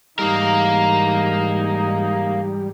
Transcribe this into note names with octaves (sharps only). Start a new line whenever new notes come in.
G#2 E3 G3 A#3 D#4 A#4